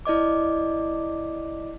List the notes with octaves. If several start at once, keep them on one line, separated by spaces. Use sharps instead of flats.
E4 D5 D#5 D6